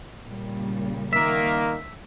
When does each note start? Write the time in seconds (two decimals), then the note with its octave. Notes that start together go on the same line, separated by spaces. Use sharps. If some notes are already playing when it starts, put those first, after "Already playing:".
0.23 A#2 C#3 G3
1.13 D#3 A#3 E5